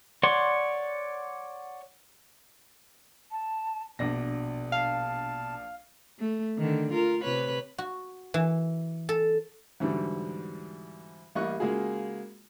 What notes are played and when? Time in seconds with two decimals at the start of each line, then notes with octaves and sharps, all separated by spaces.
0.23 C#5 D5 F#5 C6
3.31 A5
3.99 A#1 B2 D4 A#6
4.72 F5 A5
6.19 A3
6.58 D3 D#3
6.92 F4 A#4
7.24 C3 B4 C#5
7.78 F#4
8.34 E3
9.09 A4
9.80 E2 G#2 D3 F#3 G3
11.35 A1 G3 A#3 D#5 C#6 F#6
11.60 C#3 G#3 A#3 F4 F#4 G#4